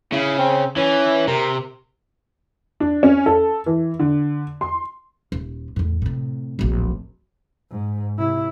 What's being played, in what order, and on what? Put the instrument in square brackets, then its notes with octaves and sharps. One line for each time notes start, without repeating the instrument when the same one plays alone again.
[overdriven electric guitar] C#3 [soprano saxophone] E4
[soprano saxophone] C4
[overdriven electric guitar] E3 [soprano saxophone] C#4
[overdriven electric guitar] C3 [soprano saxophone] A#4
[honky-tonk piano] D4
C#4
A4
E3
D3
C6
[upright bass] D#1
E2 A2
A2 C3
D1 A#1
[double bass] G#2
C3 E4